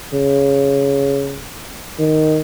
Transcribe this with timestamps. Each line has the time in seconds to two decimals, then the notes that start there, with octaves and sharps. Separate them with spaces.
0.14 C#3
1.99 D#3